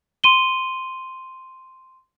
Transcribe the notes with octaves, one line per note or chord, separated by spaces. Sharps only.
C6 D#7 G7